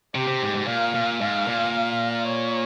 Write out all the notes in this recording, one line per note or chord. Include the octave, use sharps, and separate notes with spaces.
C3 G4
C3
G#2
G#2
A#2 F5
A#2
G#2 F5
A#2
C#5